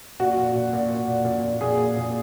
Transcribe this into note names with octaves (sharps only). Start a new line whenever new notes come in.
A#2 F#4
A#2
A#2
A#2
A#2
A#2
A#2
A#2
A#2 G#4
A#2
A#2